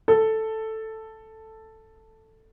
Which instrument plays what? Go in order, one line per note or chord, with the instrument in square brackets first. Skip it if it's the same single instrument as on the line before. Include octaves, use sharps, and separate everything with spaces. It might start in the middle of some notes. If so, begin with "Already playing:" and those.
[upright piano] A4